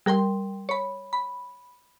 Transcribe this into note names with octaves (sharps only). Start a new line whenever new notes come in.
G3 A#4 G5 C6
C#5 B5
B5